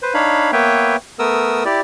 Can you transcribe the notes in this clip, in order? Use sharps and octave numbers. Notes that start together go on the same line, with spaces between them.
B4 C5
D4 D#4 C#5 F5 B5
A#3 B3 B4 C#5 E5 G5
A3 B3 A#4 D#6 E6
E4 G4 D5